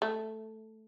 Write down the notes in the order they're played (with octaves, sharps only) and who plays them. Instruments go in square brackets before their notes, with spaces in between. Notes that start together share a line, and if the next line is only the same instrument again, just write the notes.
[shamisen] A3